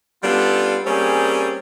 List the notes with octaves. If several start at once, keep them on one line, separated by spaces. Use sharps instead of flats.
G3 B3 C#4 D4 F4 A4
G3 A#3 C4 C#4 G#4